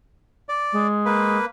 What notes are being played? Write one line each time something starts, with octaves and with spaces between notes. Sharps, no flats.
D5
G#3
A#3 B4